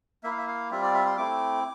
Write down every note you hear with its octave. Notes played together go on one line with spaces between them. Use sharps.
A#3 E4 E5
F5
E5
F5
G3 C4 F4 E5
D5
E5
C6
A3 C4 E4 D6